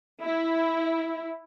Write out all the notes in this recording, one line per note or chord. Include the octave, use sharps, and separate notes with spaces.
E4